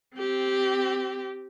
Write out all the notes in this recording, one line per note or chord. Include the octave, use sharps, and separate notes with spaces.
C4 G4